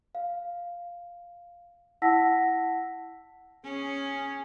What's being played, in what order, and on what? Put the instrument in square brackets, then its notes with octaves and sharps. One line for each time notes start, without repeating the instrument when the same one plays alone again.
[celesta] F5
E4 F#5 A5 E6 A#6 B6
[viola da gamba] C#4 [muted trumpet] G#4